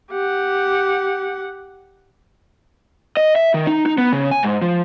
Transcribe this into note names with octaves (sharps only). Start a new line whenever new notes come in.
G4 F#5
D#5
E5
D#3
D#4
D#4
B3
C#3
G#5
G#2
F3